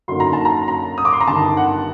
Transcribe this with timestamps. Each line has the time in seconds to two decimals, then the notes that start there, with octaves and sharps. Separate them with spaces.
0.08 F#2 D3 F#3 A#3 D#4 C6
0.20 A#5
0.33 A5
0.45 A#5
0.68 A#5
0.98 D#6
1.05 D6
1.13 C6
1.21 A#5
1.28 G1 G2 D#3 A5
1.57 F#5